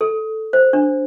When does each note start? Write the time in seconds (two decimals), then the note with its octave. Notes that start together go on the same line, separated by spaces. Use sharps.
0.01 A4
0.53 C5
0.73 D4